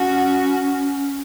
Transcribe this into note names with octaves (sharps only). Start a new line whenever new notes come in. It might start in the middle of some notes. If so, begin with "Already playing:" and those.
Already playing: C#4 F#4